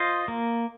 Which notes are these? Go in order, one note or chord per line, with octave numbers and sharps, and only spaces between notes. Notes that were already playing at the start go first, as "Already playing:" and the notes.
Already playing: F4 C5 D#5
A#3